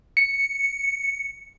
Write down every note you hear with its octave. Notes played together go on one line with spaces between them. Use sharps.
C#7